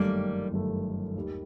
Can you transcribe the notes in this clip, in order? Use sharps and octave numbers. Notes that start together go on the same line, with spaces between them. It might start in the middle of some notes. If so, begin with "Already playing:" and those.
Already playing: G1 F#2 D#3 G3 A3 A#3
G1 F#2 D#3 A3
D#2 D#3 G3